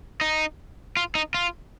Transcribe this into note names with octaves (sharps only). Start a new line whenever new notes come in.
D#4
F4
D#4
F4